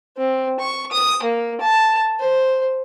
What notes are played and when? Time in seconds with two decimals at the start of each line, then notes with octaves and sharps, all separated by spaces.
0.17 C4
0.60 C#6
0.92 D#6
1.23 A#3
1.61 A5
2.20 C5